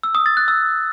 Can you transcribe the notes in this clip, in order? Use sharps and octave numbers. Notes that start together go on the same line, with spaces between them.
E6
D#6
A6
F#6
E6